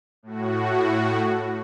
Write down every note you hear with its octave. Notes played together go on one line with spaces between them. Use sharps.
A2 F#4